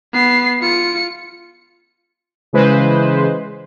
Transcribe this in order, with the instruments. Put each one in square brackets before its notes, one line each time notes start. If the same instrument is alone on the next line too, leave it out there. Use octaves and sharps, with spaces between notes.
[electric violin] B3 C7
F4 C#7
[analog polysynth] C#3 E3 G#3 B4 C5